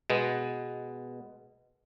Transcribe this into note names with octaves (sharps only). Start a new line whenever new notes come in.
B2 G#3 B3